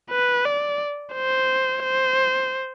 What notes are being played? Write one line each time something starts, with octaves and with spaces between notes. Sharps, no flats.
B4
D5
C5
C5